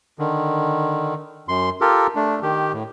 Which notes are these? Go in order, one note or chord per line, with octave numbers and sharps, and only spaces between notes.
D3 D#3
F#2 C6
F4 G4 A4 A#4
A3 D4
D#3 G4
A2